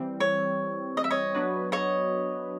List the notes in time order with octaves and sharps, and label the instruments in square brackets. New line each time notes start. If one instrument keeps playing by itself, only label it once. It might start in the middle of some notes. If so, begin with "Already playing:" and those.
Already playing: [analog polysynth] E3 G3 C4
[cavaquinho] C#5
D#5
E5
C#5 D#5
[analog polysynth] F#3 B3 D4 F#4 B4
[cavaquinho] C#5 D#5